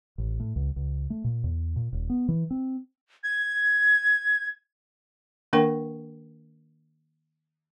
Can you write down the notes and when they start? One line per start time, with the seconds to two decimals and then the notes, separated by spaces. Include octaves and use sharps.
0.18 A1
0.40 A2
0.56 C#2
0.76 C#2
1.10 A3
1.24 A#2
1.44 E2
1.76 A#2
1.93 D#1
2.10 B3
2.28 E3
2.51 C4
3.24 G#6
5.53 D#3 A#3 D4 A#4 G5 C#6